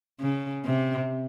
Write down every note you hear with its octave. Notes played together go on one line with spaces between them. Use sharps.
C#3
C3